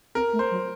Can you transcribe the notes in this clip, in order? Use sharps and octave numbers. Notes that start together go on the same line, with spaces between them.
C4 A#4
A3
C5
F#3